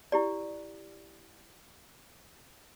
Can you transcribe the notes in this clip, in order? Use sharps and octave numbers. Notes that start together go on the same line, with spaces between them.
E4 G4 D5